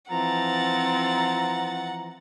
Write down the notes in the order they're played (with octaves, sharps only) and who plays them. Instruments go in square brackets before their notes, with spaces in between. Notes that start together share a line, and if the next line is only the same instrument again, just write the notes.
[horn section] E3 F3 A#5 [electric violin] C4 A6 [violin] F#5